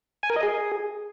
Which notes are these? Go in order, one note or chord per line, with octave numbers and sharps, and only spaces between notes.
G#5
A#4
D#5
G#4